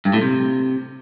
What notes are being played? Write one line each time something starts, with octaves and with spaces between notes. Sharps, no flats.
G2
A2
C3